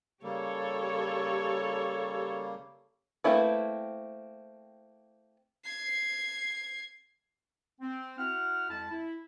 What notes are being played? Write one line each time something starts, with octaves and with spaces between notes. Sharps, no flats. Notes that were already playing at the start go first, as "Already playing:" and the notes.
C#3 G3 A#3 G4 A4 C#5
A3 A#3 C4 E4 B4
G#6 C7
C4
E4 F#4 F#5 F6
F2 G#3 E4 A5
E4